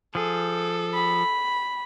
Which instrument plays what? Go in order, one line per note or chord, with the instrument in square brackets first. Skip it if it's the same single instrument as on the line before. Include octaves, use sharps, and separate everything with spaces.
[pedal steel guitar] F3 G#4 [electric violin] A4
[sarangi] B5